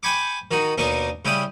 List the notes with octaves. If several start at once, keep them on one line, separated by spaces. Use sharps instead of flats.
G5 G#5 B5 C#6 D6
D#3 D#4 F#4
D#2 B2 D4 D#4 C#6
C#3 G3 E4 G5 D#6